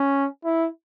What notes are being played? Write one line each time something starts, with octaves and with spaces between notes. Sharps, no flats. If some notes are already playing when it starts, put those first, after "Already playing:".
Already playing: C#4
E4